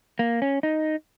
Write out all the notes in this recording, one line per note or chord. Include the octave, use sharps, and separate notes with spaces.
A#3
C#4
D#4